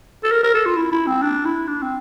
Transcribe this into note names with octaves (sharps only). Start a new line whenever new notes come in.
A4
A#4
A#4
A4
F4
E4
E4
C4
D4
E4
D4
C4